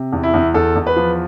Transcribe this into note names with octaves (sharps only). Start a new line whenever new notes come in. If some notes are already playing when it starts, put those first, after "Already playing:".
Already playing: C3
E2
E4
E2
E2 A4
E2
B4
F3